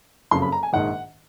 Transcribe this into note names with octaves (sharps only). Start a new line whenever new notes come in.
F#1 F2 C#3 F#3 C6
B5
A#5
G#5
A#1 G#2 D#3 F#5